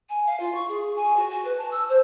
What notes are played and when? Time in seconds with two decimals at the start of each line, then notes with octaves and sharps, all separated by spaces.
0.09 G#5
0.26 F5
0.40 F4
0.55 C#6
0.68 G#4
0.96 G#5
1.16 F#4
1.30 F#4
1.44 B4
1.57 A5
1.71 E6
1.89 C5